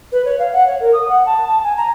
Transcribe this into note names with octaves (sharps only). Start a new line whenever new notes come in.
B4
C#5
F5
F#5
C#5
A#4
D#6
F#5
A5
A5
G#5
A#5